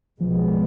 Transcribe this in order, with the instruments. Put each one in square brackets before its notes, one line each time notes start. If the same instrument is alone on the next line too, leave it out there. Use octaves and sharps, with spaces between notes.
[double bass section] B1 B2 G#3 B3 [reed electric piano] F3